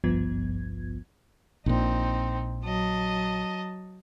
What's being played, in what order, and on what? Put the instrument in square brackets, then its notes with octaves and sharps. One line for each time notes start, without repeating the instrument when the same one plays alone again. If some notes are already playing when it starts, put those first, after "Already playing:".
[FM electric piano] G#1 C#2 G2 F3 B3 G#6
[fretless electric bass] A#1 A#2 [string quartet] C4 D#4
[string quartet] F#3 D#5 A5